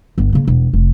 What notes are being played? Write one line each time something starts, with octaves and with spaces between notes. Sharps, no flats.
G1 B3
C#3 A#3
E1
F1